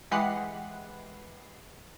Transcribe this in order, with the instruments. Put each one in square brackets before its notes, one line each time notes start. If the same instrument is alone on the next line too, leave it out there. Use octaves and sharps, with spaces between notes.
[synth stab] E3 G#3 G4 B4 F#5 C7